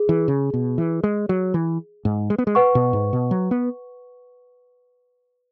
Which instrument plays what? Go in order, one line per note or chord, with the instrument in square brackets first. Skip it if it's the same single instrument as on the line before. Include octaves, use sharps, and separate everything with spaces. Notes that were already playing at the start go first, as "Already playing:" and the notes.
Already playing: [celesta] G#4
[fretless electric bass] E3
C#3
B2
E3
G#3
F#3
E3
G#2
G#3
B3
G#3
[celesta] B4 F#5 C#6
[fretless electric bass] B2
G#2
B2
F#3
B3